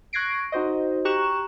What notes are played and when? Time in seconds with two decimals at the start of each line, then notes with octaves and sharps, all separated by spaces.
0.13 C#6 F#6 G#6 A#6 C7 D7
0.52 D#4 F#4 C5 D#5
1.05 G4 A#5 C#6 F#6 E7